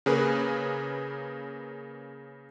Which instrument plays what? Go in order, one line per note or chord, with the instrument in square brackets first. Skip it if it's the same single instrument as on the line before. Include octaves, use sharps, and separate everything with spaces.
[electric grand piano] C#3 A#3 G#4 A#4 B4